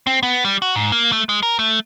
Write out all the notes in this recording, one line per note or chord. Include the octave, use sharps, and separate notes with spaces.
C4
B3
G3
F#4
G#2
A#3
A3
G#3
A#4
A3